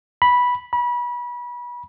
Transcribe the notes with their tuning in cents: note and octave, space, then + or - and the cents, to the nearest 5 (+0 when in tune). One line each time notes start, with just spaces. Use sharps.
B5 -10
B5 -30